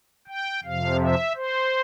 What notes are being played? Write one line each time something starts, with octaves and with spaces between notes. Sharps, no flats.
G5
F2 C3 F3 F5
E5
C5